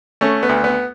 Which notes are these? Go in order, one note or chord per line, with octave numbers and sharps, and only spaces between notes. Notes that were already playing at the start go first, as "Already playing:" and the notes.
A3 C#4
B3
D2
B3